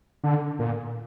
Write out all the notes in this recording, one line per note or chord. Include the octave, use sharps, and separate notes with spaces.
D3
A#2